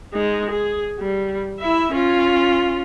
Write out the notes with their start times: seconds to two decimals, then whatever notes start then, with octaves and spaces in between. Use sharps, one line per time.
0.14 G#3 D#4
0.51 G#4
0.99 G3
1.60 E4 E5
1.93 C#4 F4